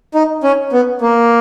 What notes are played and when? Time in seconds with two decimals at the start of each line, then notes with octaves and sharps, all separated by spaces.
0.14 D#4
0.43 C#4
0.72 B3
1.01 A#3